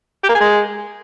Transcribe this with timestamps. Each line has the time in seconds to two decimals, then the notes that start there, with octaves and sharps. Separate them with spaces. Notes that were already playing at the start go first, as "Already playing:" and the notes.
0.23 G4
0.29 A#3
0.35 G#4
0.40 G#3